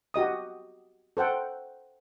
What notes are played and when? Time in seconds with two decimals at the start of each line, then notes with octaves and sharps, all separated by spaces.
0.14 F#4 G4 D#5 D#6
1.17 A4 C5 F#5 G5